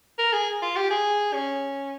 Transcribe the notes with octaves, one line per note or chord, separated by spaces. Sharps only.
A#4
G#4
F4
G4
G#4
C#4